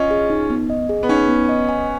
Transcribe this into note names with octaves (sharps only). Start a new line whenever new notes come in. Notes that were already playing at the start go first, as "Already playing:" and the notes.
Already playing: C#4 F4 D#5
G#4
D#4
B3
D#5
G#4
B3
C#4 D#4
B3
D#5
G#5